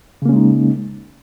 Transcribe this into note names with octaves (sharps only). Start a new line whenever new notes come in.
C#3 G#3 A#3 C#4 D#4